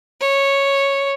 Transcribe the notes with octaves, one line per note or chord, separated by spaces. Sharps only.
C#5